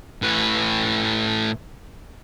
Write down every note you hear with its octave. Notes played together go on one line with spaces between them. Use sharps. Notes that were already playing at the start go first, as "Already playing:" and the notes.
A2 B4